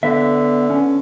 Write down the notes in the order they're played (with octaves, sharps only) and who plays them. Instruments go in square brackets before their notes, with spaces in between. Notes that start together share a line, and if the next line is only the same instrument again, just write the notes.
[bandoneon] D3 [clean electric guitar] B3 E5
[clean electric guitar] C#4